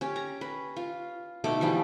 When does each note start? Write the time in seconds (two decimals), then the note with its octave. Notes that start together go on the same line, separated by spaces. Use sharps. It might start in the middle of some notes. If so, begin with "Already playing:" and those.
0.01 C#4 G4
0.16 A#5
0.41 B4
0.76 F4
1.44 B2 A3 D#4 D6
1.61 E3 F3 G3 A3